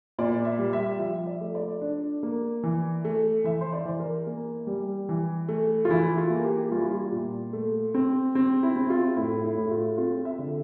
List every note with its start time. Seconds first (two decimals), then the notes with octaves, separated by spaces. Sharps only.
0.18 A#2 D5
0.45 E5
0.59 G3
0.73 E5
0.99 F3 E5
1.26 D5
1.41 A3
1.55 D5
1.81 D4
2.23 A#3
2.64 E3
3.05 A3
3.44 E3 E5
3.61 C5
3.73 D5
3.85 E3
4.00 A#4
4.27 A#3
4.67 G3
5.09 E3
5.49 A3
5.85 F4
5.89 E3 E4
6.18 F4
6.30 A#3
6.44 G4
6.72 G3 F4
6.81 E4
6.91 F4
7.12 A#2
7.53 A3
7.94 C4
8.35 C4
8.63 E4
8.76 C4
8.90 F4
9.17 A2 E4
9.44 E4
9.58 A2
9.71 F4
9.98 C4 F4
10.25 E5
10.39 D3